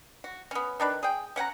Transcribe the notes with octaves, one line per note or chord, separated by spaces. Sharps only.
F#4
B3 C#4
D#3 D4 B4
G#4 G5
C#4 F#5 G5 A#5